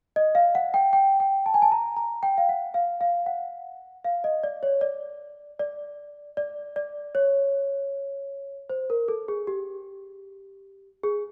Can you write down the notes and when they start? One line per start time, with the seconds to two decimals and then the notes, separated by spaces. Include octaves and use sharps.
0.16 D#5
0.35 F5
0.55 F#5
0.74 G5
0.93 G5
1.20 G5
1.46 A5
1.54 G#5
1.62 A5
1.72 A#5
1.96 A#5
2.23 G5
2.38 F5
2.49 F#5
2.74 F5
3.01 F5
3.26 F#5
4.04 F5
4.24 D#5
4.44 D5
4.63 C#5
4.81 D5
5.59 D5
6.37 D5
6.76 D5
7.15 C#5
8.70 C5
8.90 A#4
9.08 A4
9.28 G#4
9.47 G4
11.03 G#4